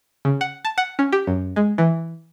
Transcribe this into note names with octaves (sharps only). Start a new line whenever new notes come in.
C#3
F#5
A5
F#5
C#4
G4
F#2
G#3
E3